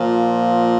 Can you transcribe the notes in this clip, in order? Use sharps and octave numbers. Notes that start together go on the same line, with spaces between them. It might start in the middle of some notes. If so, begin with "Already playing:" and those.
Already playing: A#2 F3